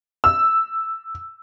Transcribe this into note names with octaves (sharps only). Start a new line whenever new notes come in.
E6